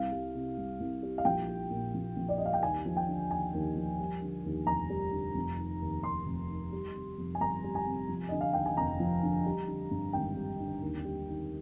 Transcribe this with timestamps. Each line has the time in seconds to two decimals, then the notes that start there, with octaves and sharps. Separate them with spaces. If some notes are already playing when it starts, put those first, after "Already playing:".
Already playing: C2 F5
0.12 G3
0.35 C3
0.58 C2
0.80 C2
1.03 G3
1.18 F5
1.25 A#1 G5
1.49 G3
1.71 A#2
1.95 A#1
2.17 A#1
2.29 D5
2.38 G3 D#5
2.46 F5
2.53 G5
2.63 D#2 G#5
2.86 F3
2.97 G5
3.08 D3
3.31 D#2 G#5
3.54 D#2
3.76 F3
3.99 G3
4.22 D3
4.45 D#2
4.67 F1 A#5
4.90 G3
5.12 D3
5.35 F1
5.58 D#3
5.81 D#2
6.03 F1 C6
6.27 F1
6.49 D#3
6.72 G3
6.95 C3
7.18 F2
7.35 G#5
7.40 G1 A#5
7.64 G3
7.75 G#5
7.87 C3
8.09 F3
8.29 D3 D#5
8.41 F5
8.53 D#2 G5
8.66 G#5
8.77 F1 A#5
9.00 F3
9.23 D3
9.46 G3
9.68 D3
9.91 G2
10.13 G#1 G5
10.37 G3
10.60 D3
10.82 D#2
11.05 G3
11.28 D#3